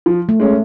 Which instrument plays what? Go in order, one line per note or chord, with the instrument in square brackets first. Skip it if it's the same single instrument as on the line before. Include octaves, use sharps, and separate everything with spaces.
[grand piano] F3
[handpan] A3
[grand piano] G#3 C#4